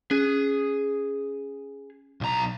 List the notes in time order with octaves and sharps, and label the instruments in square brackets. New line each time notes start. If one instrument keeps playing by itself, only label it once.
[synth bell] C#4 [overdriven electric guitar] G#4
[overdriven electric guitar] B1 A#5